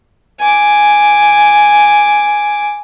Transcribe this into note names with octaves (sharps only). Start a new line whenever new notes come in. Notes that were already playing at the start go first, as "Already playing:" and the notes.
G#5 D6